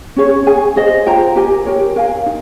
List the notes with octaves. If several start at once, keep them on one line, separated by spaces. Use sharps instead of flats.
C#4 G#4 C#5
G#4 C#5 G#5
G#4 C5 D#5
F4 C5 G5 A#5
G4 A#4 D#5 G#5
G4 A#4 C#5
A#4 F5 G#5
D#4